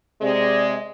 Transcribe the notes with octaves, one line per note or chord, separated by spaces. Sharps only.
C3 G#3 D5